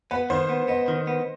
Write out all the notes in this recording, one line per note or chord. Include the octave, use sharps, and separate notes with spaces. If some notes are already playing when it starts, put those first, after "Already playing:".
B3 B4
D#3 C5
B3
B3 D#5
D#3
B3